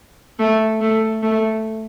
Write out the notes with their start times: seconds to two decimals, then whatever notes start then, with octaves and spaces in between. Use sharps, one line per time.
0.39 A3
0.81 A3
1.23 A3